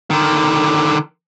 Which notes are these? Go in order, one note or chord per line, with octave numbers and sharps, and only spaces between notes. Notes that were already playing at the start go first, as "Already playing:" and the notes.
D3 D#3